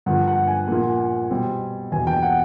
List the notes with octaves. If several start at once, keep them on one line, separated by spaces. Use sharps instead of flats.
G2 D3 F3 F#5
F#5
G#5
A#2 F3 A#3
B2 G3 C4
E2 B2 F#3 B3 G#5
G5
F#5